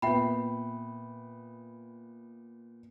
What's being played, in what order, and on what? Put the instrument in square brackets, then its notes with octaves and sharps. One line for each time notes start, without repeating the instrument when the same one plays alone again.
[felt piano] A#2 B3 [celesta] E5 G5 B5